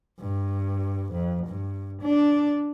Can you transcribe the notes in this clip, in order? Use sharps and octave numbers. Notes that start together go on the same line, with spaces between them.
G2
F2
G2
D4